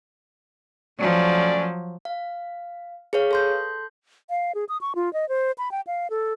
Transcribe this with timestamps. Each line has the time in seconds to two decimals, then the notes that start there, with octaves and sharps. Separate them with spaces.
0.99 F3 F#3 A3 C#4 D5
2.05 F5
3.13 G#4 B4 C#5 F5
3.31 A4 C6 G6
4.30 F5
4.55 G#4
4.69 D#6
4.81 C#6
4.95 F4
5.13 D#5
5.29 C5
5.58 B5
5.71 G5
5.87 F5
6.10 A4